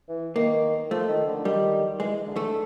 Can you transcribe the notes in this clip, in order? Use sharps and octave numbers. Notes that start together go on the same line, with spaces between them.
E3
D#3 A#3
F3 A3
D#3
D3
D#3 G3
E3 G#3
D3
A3